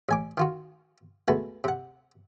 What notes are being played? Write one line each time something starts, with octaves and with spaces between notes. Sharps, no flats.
A1 G#5 D6
D#3 F4 F#4
G#3 A3 B3 F#4 B4
C3 F#5